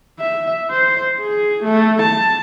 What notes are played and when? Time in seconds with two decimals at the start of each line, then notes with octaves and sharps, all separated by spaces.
0.19 E5
0.71 C5
1.20 G#4
1.64 A3
2.03 A5